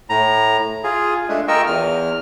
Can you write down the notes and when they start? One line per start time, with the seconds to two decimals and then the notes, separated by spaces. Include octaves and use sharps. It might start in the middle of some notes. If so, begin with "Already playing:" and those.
0.10 A2 A#5
0.84 F4 G#4
1.29 G#3 A3 D4
1.48 F4 A#4 D#5 G5 C#6 E6
1.67 E2 F6